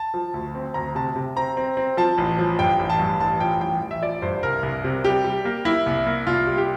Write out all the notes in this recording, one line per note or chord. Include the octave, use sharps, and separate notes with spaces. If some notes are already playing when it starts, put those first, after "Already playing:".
Already playing: A5
F3
D2
C4
D2 A#5
C3 A5
C3
C4 A#5
C4
C4
F3 A5
A1
F3
G2 G5
A1
A5
G2
A1 A5
F3 G5
A1 G5
A1
E5
F3 D5
G2 C5
C2 A#4
C2
C3
G3 G4
G3
A#3
A#3 E4
C2
A#3
C2 F4
G3
G4